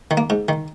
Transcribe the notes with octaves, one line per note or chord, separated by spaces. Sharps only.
D#3
A#3
G#2
D#3